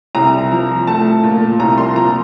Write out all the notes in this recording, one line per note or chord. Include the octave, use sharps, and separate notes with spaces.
C2 A#5
F3
A3 A5
A#2
C2 A#5
C6
F3 A#5